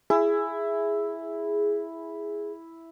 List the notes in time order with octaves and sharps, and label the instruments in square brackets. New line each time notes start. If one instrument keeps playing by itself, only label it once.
[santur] E4 [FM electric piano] G#4